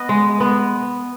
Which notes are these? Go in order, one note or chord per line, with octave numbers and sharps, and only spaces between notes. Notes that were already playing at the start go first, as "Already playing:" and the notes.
Already playing: B3 D#5
G#3
B3